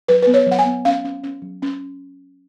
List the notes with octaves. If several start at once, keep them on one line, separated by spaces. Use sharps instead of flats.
F#3 B4
B3 B4
C#5
F#3 F#5
G#5
B3
C#4 F5
C#4
C#4
F#3
C#4